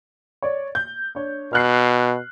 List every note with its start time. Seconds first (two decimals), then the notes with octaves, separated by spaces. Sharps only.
0.42 C#5 D5
0.75 G6
1.15 D4 C#5
1.53 B2 F6 F#6 C7